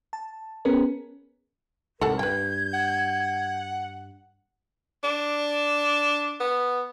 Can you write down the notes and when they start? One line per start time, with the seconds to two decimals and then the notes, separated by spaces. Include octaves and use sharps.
0.13 A5
0.65 B3 C#4 G#4 A#4 B4
2.01 C2 G#2 A4 A#4 F#5 A5
2.19 G2 B4 G5 G6 G#6
2.74 F#5
5.04 D4
6.40 B3